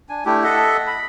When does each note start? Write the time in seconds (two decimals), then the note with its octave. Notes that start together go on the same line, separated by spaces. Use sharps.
0.09 D4 G#5
0.26 A3 D4 E4 G4
0.44 A4 D#5 E5 F#5
0.87 B5